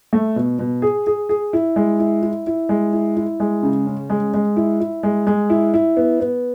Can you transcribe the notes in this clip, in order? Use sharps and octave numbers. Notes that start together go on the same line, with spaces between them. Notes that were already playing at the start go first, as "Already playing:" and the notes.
A3
B2
B2
G#4
G#4
G#4
E4
G#3
E4
E4
E4
G#3
E4
E4
G#3
C#3
C#4
G#3
G#3
E4
E4
G#3
G#3
E4
E4
B3
B3